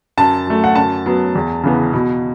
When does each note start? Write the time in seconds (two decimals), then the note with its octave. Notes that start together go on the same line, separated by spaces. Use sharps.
0.17 F#2 A5
0.47 F#3 A3
0.64 F#5
0.75 F#2 A5
1.06 F#3 B3
1.35 E2
1.63 C#3 E3 B3
1.93 B2